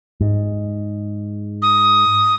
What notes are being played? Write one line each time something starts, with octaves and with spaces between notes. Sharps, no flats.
G#2
D#6